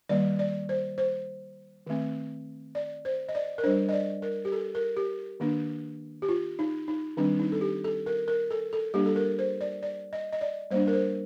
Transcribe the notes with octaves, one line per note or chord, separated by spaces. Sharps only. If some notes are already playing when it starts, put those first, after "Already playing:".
D#3 G3 A#3 D5
D5
C5
C5
D#3 A3 C4
D5
C5
D#5
D5
A#4
G3 D4 C5
D#5
D5
A#4
G4
A4
A#4
G4
D#3 A#3 D4
G4
F4
D#4
D#4
D#3 G3 C4 D4
D#4
A4
G4
A4
A#4
A#4
A4
A4
G3 A#3 D4 G4
A4
A#4
C5
D5
D5
D#5
D#5
D5
G3 A#3 D4 C5
A#4
C5